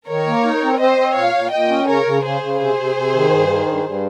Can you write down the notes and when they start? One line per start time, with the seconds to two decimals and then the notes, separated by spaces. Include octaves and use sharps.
0.08 D#3 A#4 C#5
0.27 A#3
0.44 D#4
0.63 C4
0.79 C4 C5 D#5
0.98 C4
1.16 A#2 C#5 F5
1.34 A#2
1.51 A#2 D#5 G5
1.69 C#4
1.87 C#3 A#4 C#5
2.05 C#3
2.23 C#3 G#4 C5
2.41 C#3
2.59 C3 G#4 C5
2.77 C3
2.95 C3
3.13 D#3
3.30 G2
3.49 D#3
3.66 G2
3.84 G2